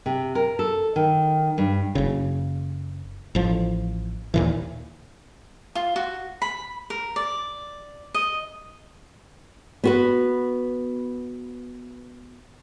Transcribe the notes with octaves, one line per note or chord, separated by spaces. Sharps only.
C3
A#4
A4
D#3
G2
F#1 C#3
A1 F3
D#2 A#2 E3
F4
F#4
B5
A#4
D5
D#5
B3 F#4 B4